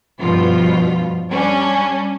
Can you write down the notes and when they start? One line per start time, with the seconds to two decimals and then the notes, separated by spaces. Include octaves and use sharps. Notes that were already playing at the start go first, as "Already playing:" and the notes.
0.19 G2 B2 F3 F4
1.30 G3 C#4 D4